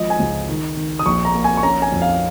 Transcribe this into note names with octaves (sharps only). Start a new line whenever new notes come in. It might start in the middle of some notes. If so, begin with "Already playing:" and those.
Already playing: G#1 F3 D#5
G#5
C#2
D#3
D#3
D#6
A#1 C#6
A#5
A#3
G#5
C#6
C#4 A#5
G#5
F2
F5